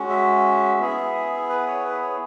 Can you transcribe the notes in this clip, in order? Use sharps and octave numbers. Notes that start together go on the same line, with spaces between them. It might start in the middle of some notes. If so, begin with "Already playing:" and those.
Already playing: G#3 C#4 F#4
E5
B3 E4 G#4
B4
C#5
B4
C#5